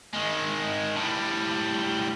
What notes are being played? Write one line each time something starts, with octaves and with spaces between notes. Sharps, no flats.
D#3 G#3
A2 G3